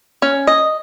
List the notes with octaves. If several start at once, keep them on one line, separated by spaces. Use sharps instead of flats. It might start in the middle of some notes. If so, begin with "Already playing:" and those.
C#4
D#5